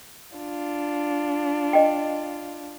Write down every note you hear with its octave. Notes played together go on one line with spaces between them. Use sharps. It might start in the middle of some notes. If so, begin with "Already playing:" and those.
D4 F4
D#5 G5